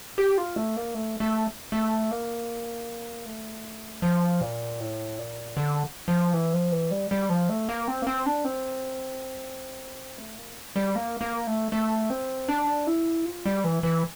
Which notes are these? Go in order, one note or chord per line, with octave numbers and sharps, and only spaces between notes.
G4
F4
A3
A#3
A3
A3
A3
A#3
A3
F3
A#2
A2
A#2
D3
F3
E3
F3
E3
G3
G3
F3
A3
A#3
C4
A#3
C4
D4
C4
A3
A#3
G3
A#3
A#3
A3
A3
C4
D4
E4
F4
G3
E3
E3